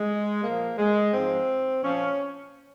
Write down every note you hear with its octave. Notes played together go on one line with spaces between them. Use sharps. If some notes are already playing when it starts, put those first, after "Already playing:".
Already playing: G#3
A#2 F3 A#3
G#3
G#2 F3 C4
A#2 F3 C#4